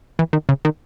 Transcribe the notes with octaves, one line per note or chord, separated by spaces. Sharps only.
E3
D#3
C#3
D#3